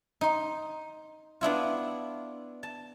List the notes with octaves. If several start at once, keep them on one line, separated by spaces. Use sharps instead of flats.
D#4 C6
B3 D4 E4 F4
A5